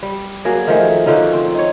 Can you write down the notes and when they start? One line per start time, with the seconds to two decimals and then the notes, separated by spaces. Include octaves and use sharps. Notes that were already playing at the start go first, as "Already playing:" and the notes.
0.03 G3
0.45 F#3 A#3 G#4
0.67 D#3 F3 A3 G#4
1.06 D3 F3 C#4 D#4
1.33 C4
1.54 D#4 C#5